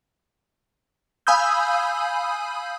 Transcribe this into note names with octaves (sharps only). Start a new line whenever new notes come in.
F5 G#5 B5 D#6 E6 G6